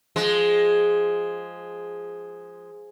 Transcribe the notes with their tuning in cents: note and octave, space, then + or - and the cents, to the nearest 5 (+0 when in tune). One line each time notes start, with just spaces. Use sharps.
F3 +0 G#3 +0